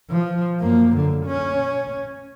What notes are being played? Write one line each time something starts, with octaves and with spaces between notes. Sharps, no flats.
F3
F#2 A#3
D3
C#4